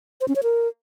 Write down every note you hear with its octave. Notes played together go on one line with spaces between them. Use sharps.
C5
C#4
C#5
A#4